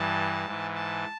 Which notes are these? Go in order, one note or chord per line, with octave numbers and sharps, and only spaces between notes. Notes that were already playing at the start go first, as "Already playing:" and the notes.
Already playing: G2 E3 A5
G#2 E3
A5